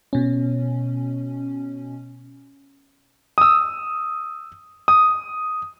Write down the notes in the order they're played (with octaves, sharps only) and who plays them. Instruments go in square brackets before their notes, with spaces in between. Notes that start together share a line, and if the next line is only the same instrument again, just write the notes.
[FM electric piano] B2 C#4
[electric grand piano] D#6 E6
D#6